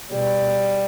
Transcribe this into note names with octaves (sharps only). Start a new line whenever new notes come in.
B2 G3